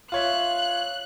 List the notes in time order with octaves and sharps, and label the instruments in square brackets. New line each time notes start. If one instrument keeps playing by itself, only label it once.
[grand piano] F4 C#5 E5 [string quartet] F#6